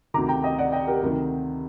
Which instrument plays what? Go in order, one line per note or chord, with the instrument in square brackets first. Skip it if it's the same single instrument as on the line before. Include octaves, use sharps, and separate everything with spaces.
[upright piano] D2 C3 D#3 A#5 D6
G5 A#5
D#5 G5
D5 F#5
D#5 G5
G4 A#4
D2 C3 D#3